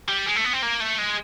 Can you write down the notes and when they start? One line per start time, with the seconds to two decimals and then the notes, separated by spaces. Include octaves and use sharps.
0.08 G3
0.26 G#3
0.36 A3
0.44 B3
0.53 C4
0.62 A#3
0.80 A3
0.98 G#3